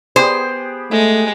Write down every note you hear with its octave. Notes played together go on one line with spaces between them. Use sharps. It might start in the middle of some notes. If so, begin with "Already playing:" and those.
B3 G4 G#4 C5
G#3 A3